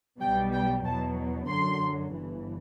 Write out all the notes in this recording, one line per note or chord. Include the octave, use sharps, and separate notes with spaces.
B1 B2 G3 G5
G5
E2 B2 F#3 A5
F#2 D3 F#3 C6
G1 G2 E3